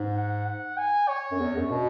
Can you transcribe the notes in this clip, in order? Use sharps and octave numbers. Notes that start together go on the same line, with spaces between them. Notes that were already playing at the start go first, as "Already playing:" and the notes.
Already playing: G#2
F#5
F#5
G#5
C#5
F#2
E2
F#2
B2